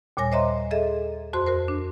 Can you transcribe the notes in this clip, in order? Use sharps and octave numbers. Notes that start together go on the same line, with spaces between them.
D#2 A#2 G3 C#5 G#5 A#6
C5 C#5 D#5 E5 A#5 C6
G#4 A4 D#5 E5
F2 F#4 C5 C6
F#4 A#4 C5
D4